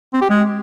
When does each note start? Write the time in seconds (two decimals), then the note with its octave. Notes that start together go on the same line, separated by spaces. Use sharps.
0.13 C4
0.22 G4
0.30 G#3